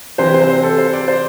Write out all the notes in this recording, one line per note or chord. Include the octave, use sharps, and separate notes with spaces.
C3 E3 C4 C5
C5
C5
A4
C5
D5
C5